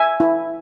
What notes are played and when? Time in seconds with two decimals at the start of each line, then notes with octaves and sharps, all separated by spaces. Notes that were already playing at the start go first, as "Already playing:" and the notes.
Already playing: E5 G#5
0.20 E4